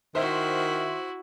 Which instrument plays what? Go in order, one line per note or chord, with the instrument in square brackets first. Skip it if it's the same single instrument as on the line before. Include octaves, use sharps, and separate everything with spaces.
[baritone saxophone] D#3 [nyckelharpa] E4 F#4 [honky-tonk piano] C5 E5